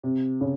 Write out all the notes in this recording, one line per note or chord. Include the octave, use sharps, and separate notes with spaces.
C3
C#3